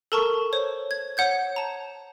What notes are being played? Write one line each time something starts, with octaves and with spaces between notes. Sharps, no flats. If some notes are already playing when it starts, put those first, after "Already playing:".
A4 A#4 A5 A#5 C#6
C5 C#5
G#6
C#5 F#5 G6 G#6
A5 A#5